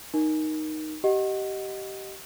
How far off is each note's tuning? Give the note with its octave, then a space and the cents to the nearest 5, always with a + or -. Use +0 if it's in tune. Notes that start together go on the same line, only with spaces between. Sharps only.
D#4 +0 A#4 +15
G4 -20 D#5 +0 F#5 +0